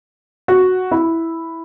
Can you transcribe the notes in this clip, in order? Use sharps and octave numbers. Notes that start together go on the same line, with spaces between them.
F#4
E4